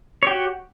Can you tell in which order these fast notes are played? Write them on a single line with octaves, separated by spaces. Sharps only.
C#5 G4 F#4